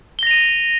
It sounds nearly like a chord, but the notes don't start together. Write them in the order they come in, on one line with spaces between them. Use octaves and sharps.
G7 A#6 F7 D#7